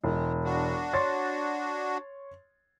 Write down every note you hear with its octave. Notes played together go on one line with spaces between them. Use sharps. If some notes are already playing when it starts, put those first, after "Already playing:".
E1 G#3
D4 F#4
C#5 C6 A6